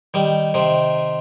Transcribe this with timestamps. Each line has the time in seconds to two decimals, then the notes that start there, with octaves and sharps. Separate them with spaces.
0.14 D#3 G3
0.54 C3 D#3